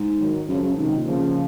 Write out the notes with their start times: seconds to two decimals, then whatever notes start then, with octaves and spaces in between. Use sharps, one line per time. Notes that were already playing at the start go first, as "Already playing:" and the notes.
Already playing: G#2
0.19 D#3 F#3
0.48 F#2 C#3 F3
0.62 F#2
0.76 G#2 C3 D#3
0.87 G#2
0.96 A#2
1.06 C#3 F3